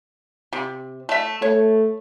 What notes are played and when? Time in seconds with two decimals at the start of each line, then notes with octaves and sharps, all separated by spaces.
0.53 C3
1.09 A3 E5
1.42 A3 C#5